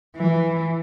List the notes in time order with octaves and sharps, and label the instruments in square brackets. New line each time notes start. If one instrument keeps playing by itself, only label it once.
[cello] E3